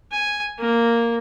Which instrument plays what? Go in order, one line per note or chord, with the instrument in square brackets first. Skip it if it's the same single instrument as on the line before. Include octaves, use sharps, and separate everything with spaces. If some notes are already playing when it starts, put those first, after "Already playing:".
[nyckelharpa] G#5
A#3